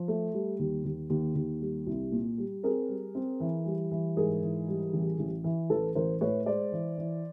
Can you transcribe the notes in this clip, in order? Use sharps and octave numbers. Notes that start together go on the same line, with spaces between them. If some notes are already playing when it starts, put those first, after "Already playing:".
Already playing: F3
A3
G3
D#2
D#2
D#2
D#2
G3
C2
A#2
G3
C4 G#4 A#4
G3
C4
E3
G3
E3
G#2 G#4 A#4
E3
G3
A1
A1
E3
A1 A4 B4
A1 A#4 C5
A2 B4 C#5
G#3 C5 D5
E3
E3